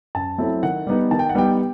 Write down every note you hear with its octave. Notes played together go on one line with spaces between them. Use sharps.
F#2 A5
F#3 A3 C4 E4
D#3 F#5
G3 B3 D#4
D#3 A5
G5
F#5
G3 B3 D#4 G5